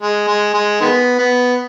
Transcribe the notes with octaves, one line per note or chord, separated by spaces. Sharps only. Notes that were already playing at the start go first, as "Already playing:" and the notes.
G#3
G#3
G#3
D#3 G#3 B3
B3